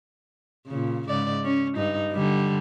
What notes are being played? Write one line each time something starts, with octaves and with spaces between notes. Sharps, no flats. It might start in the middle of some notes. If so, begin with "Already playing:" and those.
A#2 C#3
G#2 C#3 D5
C#4
G2 D#4
D3 G3